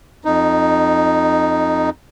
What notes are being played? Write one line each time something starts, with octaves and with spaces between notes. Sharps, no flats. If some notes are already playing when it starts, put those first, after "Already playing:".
F2 D#4